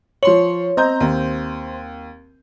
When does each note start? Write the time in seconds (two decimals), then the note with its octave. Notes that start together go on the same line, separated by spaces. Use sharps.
0.23 F3 C#5 C6 F#7
0.77 C4 D#5 A#5 G6
1.00 D#2